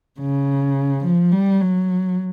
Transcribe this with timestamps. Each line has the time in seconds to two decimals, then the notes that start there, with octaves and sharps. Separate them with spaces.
0.20 C#3
1.04 F3
1.32 G3
1.60 F#3